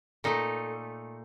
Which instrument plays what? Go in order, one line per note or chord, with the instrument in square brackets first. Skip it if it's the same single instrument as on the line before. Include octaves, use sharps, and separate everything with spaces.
[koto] A#2 A3 D#4